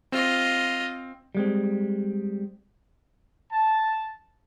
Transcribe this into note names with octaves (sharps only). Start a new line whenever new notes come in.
C4 F4 D#5
G3 G#3 C4
A5